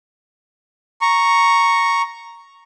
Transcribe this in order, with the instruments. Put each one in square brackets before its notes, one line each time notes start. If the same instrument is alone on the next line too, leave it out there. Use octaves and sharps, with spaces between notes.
[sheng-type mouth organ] A#5 C#6